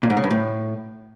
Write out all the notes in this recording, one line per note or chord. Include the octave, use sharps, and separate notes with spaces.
A#2
G#2
C#3
G2
A2